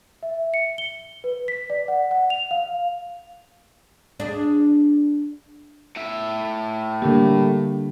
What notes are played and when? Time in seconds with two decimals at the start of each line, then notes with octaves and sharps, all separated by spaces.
0.23 E5
0.54 C#7
0.78 G7
1.24 B4
1.48 B6
1.70 D5
1.88 F#5
2.11 F#5
2.30 F7
2.51 F5
4.20 D4 G#4
5.96 A2 E5
7.02 D3 G3 A#3 D4 G4